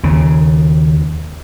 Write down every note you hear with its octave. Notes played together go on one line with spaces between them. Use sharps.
D#2 C#3